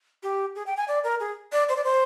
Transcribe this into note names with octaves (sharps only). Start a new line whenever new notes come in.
G4
G#4
G5
G#5
D5
A#4
G#4
D5
C5
D5
C5